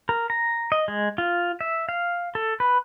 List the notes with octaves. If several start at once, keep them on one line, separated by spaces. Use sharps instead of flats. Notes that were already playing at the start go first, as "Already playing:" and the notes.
A#4
A#5
D#5
G#3
F4
E5
F5
A4
B4